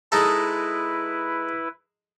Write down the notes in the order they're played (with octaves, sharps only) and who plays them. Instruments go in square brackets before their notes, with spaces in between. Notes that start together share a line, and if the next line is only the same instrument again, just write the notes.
[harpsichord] G#3 D#4 A4 [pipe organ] E4 B4